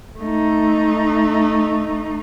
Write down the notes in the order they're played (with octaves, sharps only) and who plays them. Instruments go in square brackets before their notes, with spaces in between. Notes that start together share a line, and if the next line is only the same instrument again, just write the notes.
[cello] A3 D#4